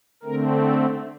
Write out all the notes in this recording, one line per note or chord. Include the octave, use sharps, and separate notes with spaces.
D3 A3 C4 A#4
A4